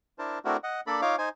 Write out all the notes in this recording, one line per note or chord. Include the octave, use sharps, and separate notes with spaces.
D4 E4 A#4 C5 A5
A3 C4 D4 E4 F#4 A#4
D#5 F#5
A#3 D4 A4 D5 B5
D#4 F4 C#5 F5 D6
D#4 C5 G#5